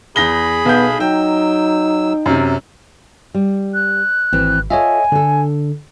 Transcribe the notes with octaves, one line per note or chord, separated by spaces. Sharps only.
E2 G#4 B5 A#6 G7
B1 B3 G6
F#3 D#4 G5 E6
F#2 C3
G3
F#6
G#1 E3 C4
F4 A4 C#5 D#5 E5 G#5
D3 D4 A4